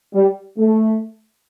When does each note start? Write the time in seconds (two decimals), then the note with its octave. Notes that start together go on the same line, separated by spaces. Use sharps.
0.14 G3
0.58 A3